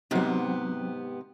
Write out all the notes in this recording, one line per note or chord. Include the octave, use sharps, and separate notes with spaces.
G#2 C3 F#3 B3 C4 G4